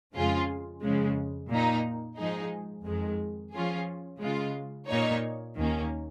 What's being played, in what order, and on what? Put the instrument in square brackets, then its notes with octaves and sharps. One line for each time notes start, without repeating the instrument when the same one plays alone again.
[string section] F2 C#3 G#3 F4 G#4
F2 C#3 G#3
A#2 A#3 D#4
G#2 F3 G#3 D#4 G#4
F2 D#3 G#3
F3 C#4 F4 G#4
C#3 G#3 F4
A#2 A#3 D#4 C#5
D#2 D#3 A#3 C#4